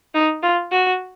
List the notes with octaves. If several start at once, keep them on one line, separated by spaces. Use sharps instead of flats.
D#4
F4
F#4